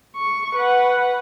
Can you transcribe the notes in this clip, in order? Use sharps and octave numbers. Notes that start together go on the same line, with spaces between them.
C#6
B4 F#5